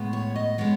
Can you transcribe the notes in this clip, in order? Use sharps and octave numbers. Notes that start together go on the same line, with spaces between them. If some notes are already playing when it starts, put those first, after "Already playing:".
Already playing: A2 G#3 B3
C#5
D#5
G#3 B3 C#5